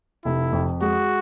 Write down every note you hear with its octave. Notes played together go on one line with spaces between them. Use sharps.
F1 E4
F2
G#3 F#4